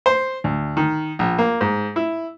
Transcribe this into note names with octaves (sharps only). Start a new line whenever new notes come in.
C5
D2
D#3
A#1
A#3
G#2
E4